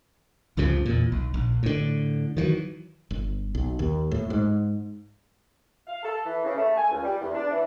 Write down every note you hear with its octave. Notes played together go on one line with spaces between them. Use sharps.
C#2 G2 C#3 F3
E2 A#2
B1
A#1
A2 D3
D#3 E3 F#3
G1
B1
D#2
A2
G#2
F5
A4
E3
C#3
A3
G#5
C#2
G3
E2
D4
E3